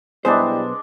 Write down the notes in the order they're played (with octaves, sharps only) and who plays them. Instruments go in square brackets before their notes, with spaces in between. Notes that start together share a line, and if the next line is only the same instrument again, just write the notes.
[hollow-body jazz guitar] B1 B3 C5 [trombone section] G3 E4 [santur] G#3 D4